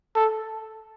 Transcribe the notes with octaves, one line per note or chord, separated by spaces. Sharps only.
A4